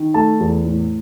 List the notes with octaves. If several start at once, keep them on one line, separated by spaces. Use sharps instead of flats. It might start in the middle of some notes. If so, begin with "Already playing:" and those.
Already playing: D#3
A3 A5
E2
A2